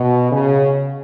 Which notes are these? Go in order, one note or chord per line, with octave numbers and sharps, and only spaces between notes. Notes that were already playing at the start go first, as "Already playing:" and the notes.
Already playing: B2
C#3